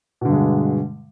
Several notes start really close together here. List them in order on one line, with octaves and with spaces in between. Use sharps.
B2 D3 G2 G#3